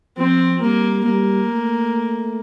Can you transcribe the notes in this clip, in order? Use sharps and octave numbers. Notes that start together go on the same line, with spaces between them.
F3 C4
G3 A#3
G3 A#3
A3